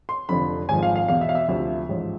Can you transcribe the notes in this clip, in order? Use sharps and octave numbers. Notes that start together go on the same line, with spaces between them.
C6
F1 F2 D3 F3 B5
G#1 G#2 F3 G#5
F5
F5
E2 B2 F5
E5
F5
E5
D2 C3 F3 E5
A1 G#2 F3